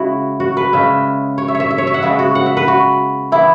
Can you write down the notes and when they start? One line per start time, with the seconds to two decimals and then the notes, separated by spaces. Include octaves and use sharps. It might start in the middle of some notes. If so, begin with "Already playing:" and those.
Already playing: C#3 G#3 E4 F#4
0.40 F#4
0.57 B4
0.73 C#3 G#3 C#4 E5
1.38 C#5
1.48 E5
1.55 C#5
1.60 E5
1.71 E5
1.78 C#5
1.87 E5
1.94 F#5
2.02 C#3 G#3 B3 E5
2.19 F#4
2.35 F#5
2.46 E5
2.57 B4
2.68 F#4
3.32 E3 B3 E4